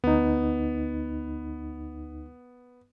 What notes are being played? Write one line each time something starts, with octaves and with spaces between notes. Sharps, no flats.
D2 B3 D#4